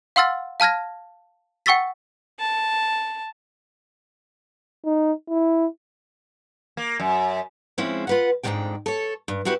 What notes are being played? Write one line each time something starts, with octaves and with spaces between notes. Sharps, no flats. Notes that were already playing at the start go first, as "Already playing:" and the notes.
F5 F#5 C6 E6 F6 A6
F5 A5 F6 G#6 A#6
F#5 G5 C#6 E6 A6 B6
A5
D#4
E4
A#3
F#2
F3 G#3 C4 C#4 E4
F4 B4 F#5
F2 G#2 D3 D#3 G#3 G5
A4 C#5
G2
C4 E4 F#4 G4 B4